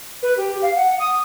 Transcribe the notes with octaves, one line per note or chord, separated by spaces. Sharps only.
B4
G4
F5
F#5
D#6